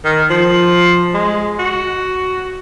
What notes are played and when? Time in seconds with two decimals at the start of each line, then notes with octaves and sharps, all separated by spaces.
0.05 D#3
0.30 F3
1.14 G#3
1.59 F#4